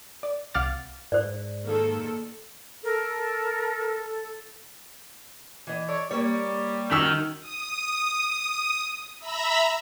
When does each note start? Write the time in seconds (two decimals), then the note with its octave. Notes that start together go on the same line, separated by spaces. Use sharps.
0.23 D5
0.54 C2 F5 F#5 D6 F6 A6
1.12 G#2 C5 D5
1.65 D#3 A#3 A4
2.84 A4 A#4
5.67 E3 D#5
5.88 A4 C#5 D5
6.11 G3 A#3 C#5
6.91 D#3 C#4 F#4 E6 B6
7.40 D#6
9.20 E5 A#5 B5 E6